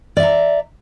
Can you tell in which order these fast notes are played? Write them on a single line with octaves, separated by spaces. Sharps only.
D5 E5 A#5